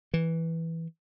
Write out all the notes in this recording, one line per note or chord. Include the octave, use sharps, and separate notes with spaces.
E3